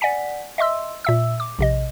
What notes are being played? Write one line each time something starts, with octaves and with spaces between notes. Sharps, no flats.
D5 F#5 G#5 B6
D#5 E5 C6 E6
A#2 E5 E6
D6
A#1 C3 D#5